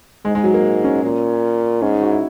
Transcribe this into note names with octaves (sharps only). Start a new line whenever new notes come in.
G#2 G#3
G#3
F#3
A#3
C#4
A#2
G#2 C#4
D#4
F#4
E4